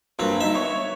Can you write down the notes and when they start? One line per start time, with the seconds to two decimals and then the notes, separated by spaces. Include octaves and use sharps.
0.19 G2 F#3 A#3 C4
0.41 D#4 E5
0.54 B3 C#5